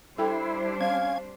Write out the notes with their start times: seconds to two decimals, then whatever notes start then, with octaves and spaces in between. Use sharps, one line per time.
0.18 G3 D4 E4 A4 C5 G5 B5
0.81 C4 C#4 F5 G#6